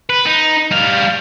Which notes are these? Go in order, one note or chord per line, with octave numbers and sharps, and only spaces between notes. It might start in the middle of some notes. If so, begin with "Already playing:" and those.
B4
D#4
G3 F5